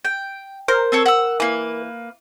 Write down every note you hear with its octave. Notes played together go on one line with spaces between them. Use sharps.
G5
A#4 C5
C4 A4 C#5
F#5 E6
E3 A#3 B4